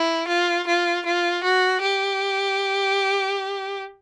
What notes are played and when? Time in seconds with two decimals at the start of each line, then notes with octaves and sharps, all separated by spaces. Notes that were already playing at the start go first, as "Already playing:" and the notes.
Already playing: E4
0.28 F4
0.67 F4
1.06 F4
1.43 F#4
1.82 G4